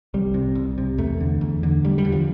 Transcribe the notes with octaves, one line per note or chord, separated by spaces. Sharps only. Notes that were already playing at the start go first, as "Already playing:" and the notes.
C2 G3
C3
C2
C3
E2 A3
D3
E2
D3
E2 G3
G3
D3
F3